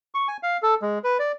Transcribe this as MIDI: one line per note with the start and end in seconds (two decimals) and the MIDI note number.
0.15 0.28 85
0.28 0.37 80
0.43 0.57 77
0.63 0.75 69
0.82 0.99 56
1.04 1.18 71
1.19 1.32 74